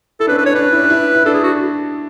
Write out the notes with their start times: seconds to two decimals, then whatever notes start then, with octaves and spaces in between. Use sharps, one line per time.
0.20 E4 A4
0.27 D4 B4
0.31 C#4
0.38 B4
0.43 D4 C#5
0.55 D4 B4
0.72 E4
0.84 D4
0.90 E4
1.15 E4
1.25 D4 A4
1.34 G#4
1.43 F#4